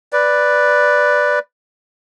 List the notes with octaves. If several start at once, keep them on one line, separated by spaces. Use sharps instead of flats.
B4 D5